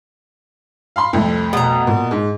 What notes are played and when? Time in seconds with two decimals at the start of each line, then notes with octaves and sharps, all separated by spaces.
0.96 F5 B5 C6
1.13 C2 F2 A3
1.53 B2 A#5
1.87 A#2
2.11 G#2